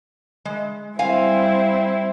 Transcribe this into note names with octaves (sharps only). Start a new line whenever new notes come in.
G#3
G3 C4 E4 F5 G#5